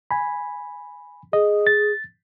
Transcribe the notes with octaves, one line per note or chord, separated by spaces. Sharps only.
G#5 B5
G#4 D#5
A6